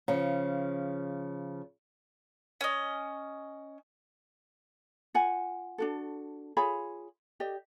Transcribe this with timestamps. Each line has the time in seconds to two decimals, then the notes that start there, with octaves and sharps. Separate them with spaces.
0.08 C#3 F3
2.61 C#4 D#5
5.14 F4 F#5 G#5
5.78 D4 F#4 A4
6.57 F4 G#4 C#5 B5
7.40 G4 D5 D#5